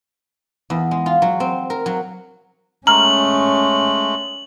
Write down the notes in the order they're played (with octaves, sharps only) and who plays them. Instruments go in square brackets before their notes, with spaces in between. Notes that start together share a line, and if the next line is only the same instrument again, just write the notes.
[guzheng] E2
G#3
F4
F#3
C4
A#4
F#3
[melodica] G#3 A3 [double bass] C#4 [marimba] A#5 F6 [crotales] F#7